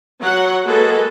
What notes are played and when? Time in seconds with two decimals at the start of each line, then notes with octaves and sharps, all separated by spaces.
0.20 F#3 F#5
0.65 G#3 A#3 F#4 G#4 A4 B4